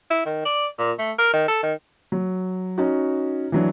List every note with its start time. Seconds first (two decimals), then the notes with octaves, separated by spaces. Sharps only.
0.11 E4
0.26 D#3
0.45 D5
0.79 A#2
0.99 A3
1.18 A#4
1.34 D#3
1.48 A4
1.63 D#3
2.12 F#3
2.78 C#4 D#4 F#4
3.52 E3 F#3 D4